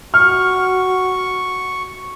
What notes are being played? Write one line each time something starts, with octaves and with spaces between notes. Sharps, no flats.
F#4 C#6 F6